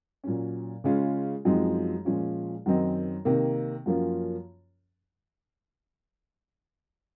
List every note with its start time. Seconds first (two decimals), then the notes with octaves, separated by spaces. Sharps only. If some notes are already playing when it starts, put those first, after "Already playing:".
0.24 A#2 F#3 C#4
0.84 C#3 G#3 C#4 F4
1.45 F#2 F3 G#3 C4 D#4
2.05 A#2 F3 G#3 C#4 F4
2.66 F#2 D#3 F#3 C4 D#4
3.25 C3 D#3 A#3
3.86 F#2 F3 A#3 C#4 F4